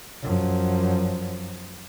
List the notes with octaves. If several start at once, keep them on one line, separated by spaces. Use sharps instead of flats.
F#2 F3